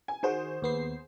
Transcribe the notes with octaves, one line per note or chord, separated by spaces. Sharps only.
G#5
D#3 F#4 G#4 C5
D#2 B3 C7